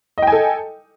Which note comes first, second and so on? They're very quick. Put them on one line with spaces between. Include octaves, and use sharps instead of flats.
D#5 G5 G#5 A4